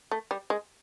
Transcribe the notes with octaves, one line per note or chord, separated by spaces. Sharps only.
A3
G3
G#3